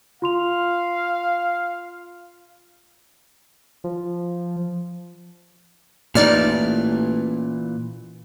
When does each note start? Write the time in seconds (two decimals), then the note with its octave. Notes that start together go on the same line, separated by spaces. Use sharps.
0.22 F4 F5 C6 F7
3.84 F3
6.15 A1 A#2 E3 D#4 D5 F6